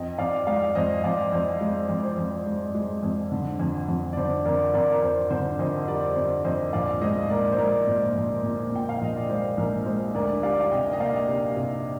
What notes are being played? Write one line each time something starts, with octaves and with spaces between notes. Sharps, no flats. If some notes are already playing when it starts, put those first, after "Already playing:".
Already playing: F2 D#5 G5
F2 D5 F5
G#3 D5 F5
F2 C5 D#5
F2 D5 F5
F2 C5
G#3
F2
D5
C5
F2
G#3
G#3
F2
D3
F2
F2
D5
D3 C5
F2 A#4 D5
F2 A#4 D5
A#4
F2 C5
D3 C5
F2 C5 D#5
G3 A#4 D5
D3 C5
F2 C5 D#5
A#1 D5 F5
G#3 C5 D#5
A#2 A#4 D5
C5
G#3 A#4 D5
A#2
A#1
A#2
A#2 G5
F5
A#1 D#5
D5
G#3 C5
A#1 A#4
G#3 C5
D2 A#4 D5
G3 D5 F5
F5
C3 D#5 G5
D#5
A#3 D5 F5
C3
C3